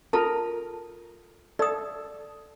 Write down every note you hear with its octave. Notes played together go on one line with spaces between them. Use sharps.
F4 A4 A#4 A5
A4 D5 D#6